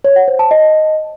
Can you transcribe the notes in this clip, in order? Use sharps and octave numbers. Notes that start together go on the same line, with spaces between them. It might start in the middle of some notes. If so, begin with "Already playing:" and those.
C#5
F#5
C5
A5
D#5